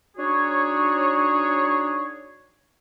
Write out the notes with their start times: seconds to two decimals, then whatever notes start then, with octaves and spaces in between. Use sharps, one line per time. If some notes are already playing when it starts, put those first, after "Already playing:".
0.17 D4 D#4 F#4 G#4 C#5